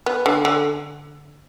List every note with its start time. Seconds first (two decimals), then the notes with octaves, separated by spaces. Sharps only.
0.06 B3
0.26 D3
0.45 D3